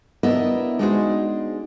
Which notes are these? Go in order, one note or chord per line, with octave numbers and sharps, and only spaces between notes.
B3 D4 E4 A#4 D#5 E5
G#3 D4 D#4 F#4 G#4 C5